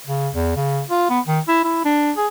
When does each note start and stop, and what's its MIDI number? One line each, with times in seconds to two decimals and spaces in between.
0.06 0.29 49
0.34 0.53 40
0.56 0.81 49
0.89 1.08 65
1.10 1.20 59
1.27 1.39 51
1.48 1.62 64
1.64 1.81 64
1.85 2.12 62
2.17 2.27 68